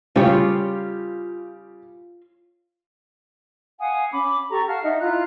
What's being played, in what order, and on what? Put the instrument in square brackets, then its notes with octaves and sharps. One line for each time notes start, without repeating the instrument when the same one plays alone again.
[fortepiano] C#3 G3 G4 [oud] F4 C#5
[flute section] F5 F#5 G#5 D#6
C#4 B5 D6
G4 A4 A#5 C#6
F5 F#5 A5 F6
D#4 D#5 E5 F#5
E4 F4 A#5 F#6